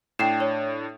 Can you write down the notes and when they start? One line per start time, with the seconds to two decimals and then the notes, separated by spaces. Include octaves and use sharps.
0.19 A2 D4 G5 C7 E7
0.40 C#5